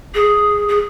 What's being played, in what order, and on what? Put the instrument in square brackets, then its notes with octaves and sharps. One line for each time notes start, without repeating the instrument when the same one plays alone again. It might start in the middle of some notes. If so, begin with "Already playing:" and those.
[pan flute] G#4
G#4